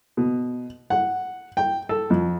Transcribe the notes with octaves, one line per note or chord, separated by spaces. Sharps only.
B2
F#5
G5
A4
F2